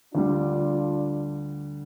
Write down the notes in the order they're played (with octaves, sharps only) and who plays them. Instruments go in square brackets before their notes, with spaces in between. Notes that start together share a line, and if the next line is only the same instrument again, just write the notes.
[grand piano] D2 D3 G3 [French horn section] D4 F4